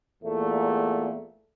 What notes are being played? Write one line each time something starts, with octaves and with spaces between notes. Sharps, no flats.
E2 A#2 A3